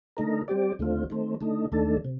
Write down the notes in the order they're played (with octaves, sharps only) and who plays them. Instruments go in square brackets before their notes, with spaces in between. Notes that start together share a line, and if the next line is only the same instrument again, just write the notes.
[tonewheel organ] D3 A3 D#4 A#4
G3 C4 G4 D5
D#2 D3 A3 C4 F4
D#3 A3 C4
D3 A3 D#4
D#2 D#3 A3 D4 A4
C3